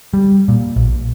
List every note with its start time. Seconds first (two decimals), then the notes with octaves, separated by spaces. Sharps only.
0.14 G3
0.48 A#2
0.76 A#1